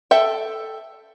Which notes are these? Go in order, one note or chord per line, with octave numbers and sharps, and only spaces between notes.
A4 E5 G5